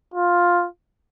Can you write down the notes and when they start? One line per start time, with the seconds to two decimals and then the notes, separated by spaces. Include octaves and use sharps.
0.14 F4